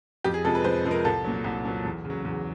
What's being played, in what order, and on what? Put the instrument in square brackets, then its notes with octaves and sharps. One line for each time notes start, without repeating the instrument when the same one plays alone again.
[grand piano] F2 G4
G#4
C3 F3 G#3 A4
B4
F2 C5
C3 F3 G#3
A#4
C2 A4
A#2 F#3
C2
A#2 F#3
E2
C#3
F#3
E2